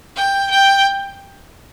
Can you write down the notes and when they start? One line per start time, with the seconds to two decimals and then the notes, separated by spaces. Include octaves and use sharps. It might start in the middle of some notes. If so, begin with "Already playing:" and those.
0.16 G5
0.51 G5